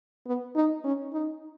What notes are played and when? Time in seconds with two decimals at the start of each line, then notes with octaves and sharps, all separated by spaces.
0.26 B3
0.55 D#4
0.84 C#4
1.13 D#4